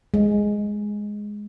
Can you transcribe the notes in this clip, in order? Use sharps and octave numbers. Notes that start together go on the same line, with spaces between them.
G#3